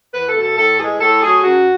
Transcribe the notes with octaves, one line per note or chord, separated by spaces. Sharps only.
E2 B4
A4
B2 A3
A4
A2 A4
E3 G#3 G#4
A2 A4
F#3 A3 G#4
F#2 F#4